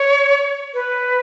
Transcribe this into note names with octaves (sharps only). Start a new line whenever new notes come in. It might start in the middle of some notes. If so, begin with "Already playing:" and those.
Already playing: C#5
B4